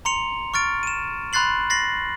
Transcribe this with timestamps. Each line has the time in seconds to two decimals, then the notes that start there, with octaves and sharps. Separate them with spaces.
0.05 A#5 C6 C#7 F7
0.54 C#6 F6 A6 D7
0.83 D#7 E7
1.33 B5 C6 F#6 A6 C7 F#7
1.70 A6 A#6 C7 F#7